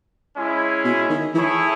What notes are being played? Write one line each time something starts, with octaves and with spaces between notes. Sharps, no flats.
G#3 C#4 E4 G#4
B2
D#3
E3 A3 E4 G#4 C#5